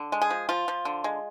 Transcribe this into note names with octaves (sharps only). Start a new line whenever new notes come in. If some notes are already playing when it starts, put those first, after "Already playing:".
Already playing: D3
G#3
G#4
F3
F3 F4
F3
D3
G#3